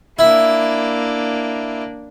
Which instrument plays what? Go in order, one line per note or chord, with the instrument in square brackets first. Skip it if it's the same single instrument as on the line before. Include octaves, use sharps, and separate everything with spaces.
[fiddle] A#3 D4 [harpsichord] E4